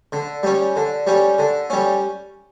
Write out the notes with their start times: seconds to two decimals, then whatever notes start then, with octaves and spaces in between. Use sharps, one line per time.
0.12 D3
0.43 G3 C#4
0.76 D3
1.07 G3 C#4
1.39 D3
1.70 G3 C#4